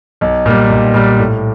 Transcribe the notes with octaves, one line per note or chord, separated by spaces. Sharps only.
B1
A#2 G3
B1
A#2 G3
A2